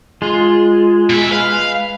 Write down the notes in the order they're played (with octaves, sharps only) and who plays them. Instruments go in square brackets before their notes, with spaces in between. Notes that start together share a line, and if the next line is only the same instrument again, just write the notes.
[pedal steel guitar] G#3 [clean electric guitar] F4 C6
[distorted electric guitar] B2 E5
[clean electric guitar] B4 [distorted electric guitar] F5